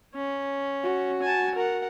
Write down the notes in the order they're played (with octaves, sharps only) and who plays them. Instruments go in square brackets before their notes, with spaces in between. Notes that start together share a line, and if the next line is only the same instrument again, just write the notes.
[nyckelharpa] C#4
[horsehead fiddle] F#4
[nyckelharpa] G#5 A5
A#4 F#5